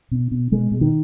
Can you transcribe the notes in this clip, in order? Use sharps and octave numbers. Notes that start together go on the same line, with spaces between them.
B2
B2
B2 G#3
B2
D#3